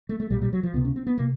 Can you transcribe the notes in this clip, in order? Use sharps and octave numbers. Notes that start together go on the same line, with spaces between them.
A3
A3
B1 A#2 G3
G3
F#3
F3
C#2 C3 B3
C#4
C4
B3
C3 A#3